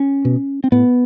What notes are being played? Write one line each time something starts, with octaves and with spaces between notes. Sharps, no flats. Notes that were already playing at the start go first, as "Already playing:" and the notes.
Already playing: C#4
B2
C4
A2 B3